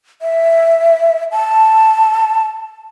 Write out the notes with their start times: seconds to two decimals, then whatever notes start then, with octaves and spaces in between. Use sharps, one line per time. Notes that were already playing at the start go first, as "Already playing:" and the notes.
0.22 E5
1.32 A5